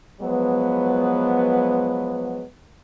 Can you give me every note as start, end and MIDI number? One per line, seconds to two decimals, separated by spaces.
0.21 2.43 53
0.21 2.43 54
0.21 2.43 56
0.21 2.43 59